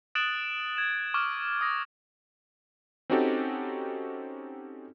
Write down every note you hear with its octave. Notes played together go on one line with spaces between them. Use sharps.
D#6 F#6 A6 D7 E7 F#7
G#6 E7
C#6 D6 F6
D#6 A#6
C4 C#4 D#4 F#4 G4 A4